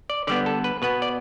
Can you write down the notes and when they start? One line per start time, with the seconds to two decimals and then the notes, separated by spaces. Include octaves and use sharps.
0.10 D5
0.27 D3 G3 B3 D5
0.46 A4
0.64 B4
0.82 B2 B3 B4
1.02 D5